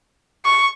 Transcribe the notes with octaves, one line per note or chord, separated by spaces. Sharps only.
C#6